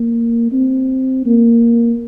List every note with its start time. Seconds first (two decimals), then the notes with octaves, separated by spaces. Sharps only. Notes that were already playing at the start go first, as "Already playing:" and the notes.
Already playing: A#3
0.52 C4
1.25 A#3